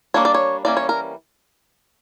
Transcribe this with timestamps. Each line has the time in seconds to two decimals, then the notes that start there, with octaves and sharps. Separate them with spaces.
0.14 G3 A#3 D4 C#5
0.25 D5
0.34 C#5
0.65 E3 G3 A#3 C#4 D5
0.77 C#5
0.89 A#4